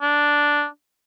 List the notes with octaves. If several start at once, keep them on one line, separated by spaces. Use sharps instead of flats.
D4